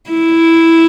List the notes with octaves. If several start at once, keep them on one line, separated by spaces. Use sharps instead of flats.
E4